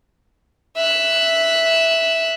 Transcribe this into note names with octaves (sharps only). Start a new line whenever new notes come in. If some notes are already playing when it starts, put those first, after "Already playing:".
E5 F#6